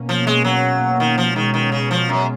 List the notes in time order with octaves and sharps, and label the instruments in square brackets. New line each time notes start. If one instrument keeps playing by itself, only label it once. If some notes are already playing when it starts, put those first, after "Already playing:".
Already playing: [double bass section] B2 A#3 C#4
[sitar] F3
G#3
F#3
D#3
F3
[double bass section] B2 G#3 C#4 [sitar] D#3
[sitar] D#3
C#3
F3
F#2